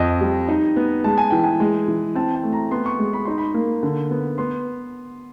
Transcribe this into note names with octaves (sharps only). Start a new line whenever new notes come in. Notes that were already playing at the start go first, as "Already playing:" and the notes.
Already playing: F2 D#5
G3
D#4
B3
G#3 A5
G#5
E3 G5
G#5
G#3
E3
C4 A5
A5
A3
A#5
B3 C6
C#6
G#3
B5
D#4 C6
B5
A#3
D3
B3
B3 C6